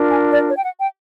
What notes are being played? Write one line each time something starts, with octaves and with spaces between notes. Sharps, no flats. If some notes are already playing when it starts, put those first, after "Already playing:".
Already playing: D4 F4 A#4
G#5
D5
C#5
G5
F#5
G5